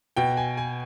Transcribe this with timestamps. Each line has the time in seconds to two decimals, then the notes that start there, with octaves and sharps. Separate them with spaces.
0.16 B2 G5
0.37 G#5
0.57 G#5